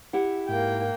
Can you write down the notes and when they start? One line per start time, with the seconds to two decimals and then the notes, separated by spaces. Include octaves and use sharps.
0.13 E4 G4 F#5
0.48 G#2 A#3 G5